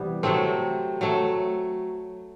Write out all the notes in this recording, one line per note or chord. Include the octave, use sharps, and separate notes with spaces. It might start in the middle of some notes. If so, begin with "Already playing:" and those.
Already playing: C3 E3 G3 B3
C3 F#3 A3 C4
F#3 A3